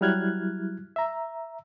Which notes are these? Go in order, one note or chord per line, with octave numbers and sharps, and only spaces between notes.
F#3 G3 E4 F6 F#6 G#6
E5 A#5